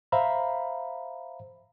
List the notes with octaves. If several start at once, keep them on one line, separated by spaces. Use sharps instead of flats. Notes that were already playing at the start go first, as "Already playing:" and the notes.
C5 E5 F5 A#5 B5